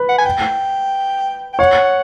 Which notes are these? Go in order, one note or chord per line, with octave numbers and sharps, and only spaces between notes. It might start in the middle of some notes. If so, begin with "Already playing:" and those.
Already playing: B4
F#5
G#5
G5
G5
C#5 F#5